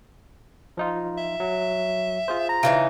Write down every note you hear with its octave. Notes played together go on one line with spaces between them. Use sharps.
F3 D#4 F4
E5
F#3
F4 G#4 C5
A#5
C#3 E3 D#4